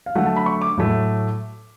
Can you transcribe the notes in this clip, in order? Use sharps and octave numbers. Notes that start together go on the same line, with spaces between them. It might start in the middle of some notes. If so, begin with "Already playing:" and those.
F5
D3 F#3 A3 F#5
A5
B5
C#6
D6
A2 F#3 A3